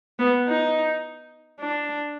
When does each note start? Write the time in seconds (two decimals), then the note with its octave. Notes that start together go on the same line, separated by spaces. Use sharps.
0.19 B3
0.48 D#4
1.60 D4